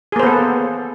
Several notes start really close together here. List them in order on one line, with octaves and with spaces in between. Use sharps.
G#4 A#3 C5 B3 A4